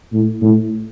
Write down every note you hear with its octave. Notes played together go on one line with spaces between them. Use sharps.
A2
A2